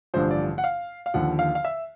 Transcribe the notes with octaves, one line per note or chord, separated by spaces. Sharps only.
A1 G2 D3 F3 C5
D5
F#5
F5
F5
D#2 D3 F3 F#5
F5
F5
E5